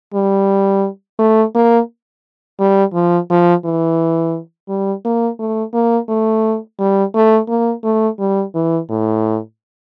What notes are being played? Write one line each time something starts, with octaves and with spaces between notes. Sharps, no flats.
G3
A3
A#3
G3
F3
F3
E3
G3
A#3
A3
A#3
A3
G3
A3
A#3
A3
G3
E3
A2